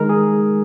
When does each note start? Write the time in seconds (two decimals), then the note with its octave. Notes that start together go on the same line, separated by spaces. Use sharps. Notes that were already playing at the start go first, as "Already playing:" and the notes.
Already playing: D#3 G#3 D#4 A#4
0.09 G#4